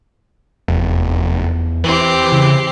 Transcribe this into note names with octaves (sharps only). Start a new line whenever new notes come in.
F1 E2
E3 C4 G4
C#3